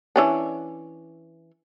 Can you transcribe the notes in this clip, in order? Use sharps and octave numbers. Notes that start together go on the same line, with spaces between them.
E3 C#4 D4